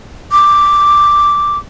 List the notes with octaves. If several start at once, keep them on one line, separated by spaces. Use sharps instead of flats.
D6